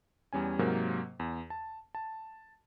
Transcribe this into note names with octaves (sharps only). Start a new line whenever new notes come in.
E2 G3 C#4 G#5
G#2 C3 F#3 A#3 A#4
E2
A5
A5